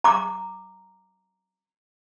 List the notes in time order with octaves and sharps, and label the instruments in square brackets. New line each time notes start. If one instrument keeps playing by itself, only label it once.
[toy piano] A#5 D6